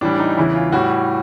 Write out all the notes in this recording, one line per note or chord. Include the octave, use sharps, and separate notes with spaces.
A2 E3 G3 D4
D#4
E2 C#3 E3 E4
F4
A2 E3 G3 F#4